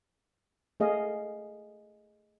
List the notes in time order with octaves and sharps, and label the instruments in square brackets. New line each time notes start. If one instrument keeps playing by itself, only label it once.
[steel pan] A3 G#4 D#5 F5